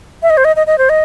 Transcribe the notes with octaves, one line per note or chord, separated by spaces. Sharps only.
E5
D#5
C5
D#5
D#5
D#5
C5
D#5